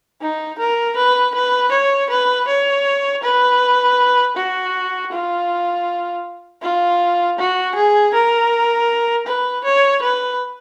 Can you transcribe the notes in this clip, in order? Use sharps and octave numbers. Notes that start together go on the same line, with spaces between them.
D#4
A#4
B4
B4
C#5
B4
C#5
B4
F#4
F4
F4
F#4
G#4
A#4
B4
C#5
B4